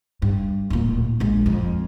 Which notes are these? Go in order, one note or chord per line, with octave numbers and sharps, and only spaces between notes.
G2
D1 A#2
A#1 G#3
F2